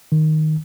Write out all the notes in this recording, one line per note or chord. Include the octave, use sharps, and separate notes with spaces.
D#3